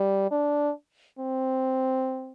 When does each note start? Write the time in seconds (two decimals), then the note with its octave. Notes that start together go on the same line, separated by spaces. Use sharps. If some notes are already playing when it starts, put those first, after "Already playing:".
Already playing: G3
0.31 D4
1.19 C4